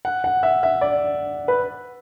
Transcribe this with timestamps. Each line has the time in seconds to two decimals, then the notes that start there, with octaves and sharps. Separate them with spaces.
0.05 F#5
0.24 F#5
0.43 E5
0.63 E5
0.81 D5
1.48 B4